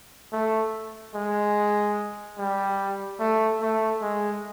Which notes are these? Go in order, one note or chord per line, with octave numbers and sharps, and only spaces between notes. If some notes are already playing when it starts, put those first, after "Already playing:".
A3
G#3
G3
A3
A3
G#3